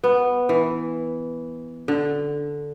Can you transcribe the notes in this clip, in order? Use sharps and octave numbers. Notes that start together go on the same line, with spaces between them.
B3
E3
D3